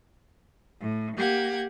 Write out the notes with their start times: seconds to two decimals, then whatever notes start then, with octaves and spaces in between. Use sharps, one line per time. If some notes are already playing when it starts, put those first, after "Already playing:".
0.79 A2
1.17 A#3 G4 F#5 G#6